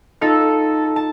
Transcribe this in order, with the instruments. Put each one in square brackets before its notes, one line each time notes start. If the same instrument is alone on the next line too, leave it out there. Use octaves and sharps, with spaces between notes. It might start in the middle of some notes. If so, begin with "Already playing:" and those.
[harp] D#4 F4 [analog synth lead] A4
[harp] A5